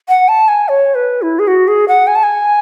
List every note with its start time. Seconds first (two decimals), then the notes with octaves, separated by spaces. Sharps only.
0.09 F#5
0.28 A5
0.48 G#5
0.69 C#5
0.95 B4
1.22 E4
1.39 G#4
1.48 F#4
1.68 G#4
1.88 F#5
2.07 G#5
2.15 A5
2.23 G#5